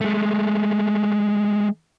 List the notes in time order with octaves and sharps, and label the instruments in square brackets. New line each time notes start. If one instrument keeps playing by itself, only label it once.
[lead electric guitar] G#3 A3